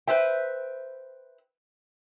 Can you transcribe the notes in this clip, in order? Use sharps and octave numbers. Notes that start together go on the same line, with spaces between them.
B4 C5 E5 G5